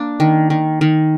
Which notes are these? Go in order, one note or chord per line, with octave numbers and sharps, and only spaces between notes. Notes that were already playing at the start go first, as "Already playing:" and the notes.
Already playing: A#3 D4
D#3
D#3
D#3